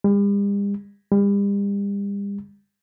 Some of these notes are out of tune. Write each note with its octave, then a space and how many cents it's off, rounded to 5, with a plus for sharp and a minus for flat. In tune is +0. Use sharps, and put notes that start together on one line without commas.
G3 +45
G3 +40